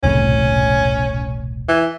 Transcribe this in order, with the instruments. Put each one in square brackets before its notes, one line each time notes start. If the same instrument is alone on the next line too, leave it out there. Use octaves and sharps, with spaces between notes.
[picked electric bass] E1 C2 A2 [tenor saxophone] C#4
[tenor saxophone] E3